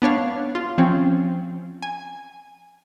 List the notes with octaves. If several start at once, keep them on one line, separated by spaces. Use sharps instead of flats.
B3 D4 C#5 F5
F4
F3 C4 C#4
G#5